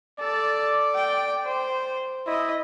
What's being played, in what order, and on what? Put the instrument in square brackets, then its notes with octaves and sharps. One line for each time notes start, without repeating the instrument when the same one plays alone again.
[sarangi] A4 [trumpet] D5
[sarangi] G5
C5
[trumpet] E4 [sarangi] D#5